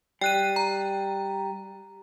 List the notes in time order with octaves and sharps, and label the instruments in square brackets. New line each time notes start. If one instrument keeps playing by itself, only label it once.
[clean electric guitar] G3 [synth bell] G5 F#6 D#7
[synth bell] A#5